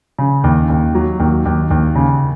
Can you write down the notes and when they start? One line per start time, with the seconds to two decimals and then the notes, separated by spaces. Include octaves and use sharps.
0.19 C#3
0.44 D#2
0.70 D#2
0.95 F#3
1.20 D#2
1.45 D#2
1.71 D#2
1.95 C#3